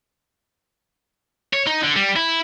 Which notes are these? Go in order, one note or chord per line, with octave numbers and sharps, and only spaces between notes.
C#5
D#4
D3
G3
E4